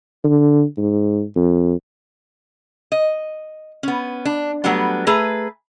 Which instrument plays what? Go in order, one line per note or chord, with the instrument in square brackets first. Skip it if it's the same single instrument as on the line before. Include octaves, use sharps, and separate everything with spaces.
[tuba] D3
G#2
F2
[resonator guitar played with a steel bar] D#5
B3 C#4
D4
F#3 G3 A3 B3 D4
A3 G#4 B4 A#5